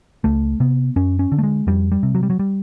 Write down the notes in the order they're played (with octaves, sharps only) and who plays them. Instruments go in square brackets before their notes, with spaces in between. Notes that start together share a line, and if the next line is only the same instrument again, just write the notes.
[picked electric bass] C#2 A3
C3 B3
F#2 C#4
C#4
D3
A3
G#3
F2 G3
G3
C3
F#3
G3
F#3
G3